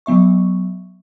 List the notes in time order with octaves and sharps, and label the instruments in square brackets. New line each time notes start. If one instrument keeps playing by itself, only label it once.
[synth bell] F#3 B3 E5 C#6